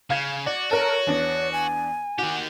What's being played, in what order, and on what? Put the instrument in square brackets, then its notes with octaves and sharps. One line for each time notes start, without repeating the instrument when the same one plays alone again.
[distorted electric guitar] C#3 [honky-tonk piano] F5 G#6
[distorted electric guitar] F#4 [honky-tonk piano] D5
[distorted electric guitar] F#4 [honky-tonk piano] A4 A#4 [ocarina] C#5
[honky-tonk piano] E2 B3 D4
[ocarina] G#5
[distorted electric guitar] D#3 G4 [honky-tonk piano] F#4